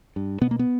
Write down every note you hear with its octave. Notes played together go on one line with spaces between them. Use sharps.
G2
B2 B3
A#3
B3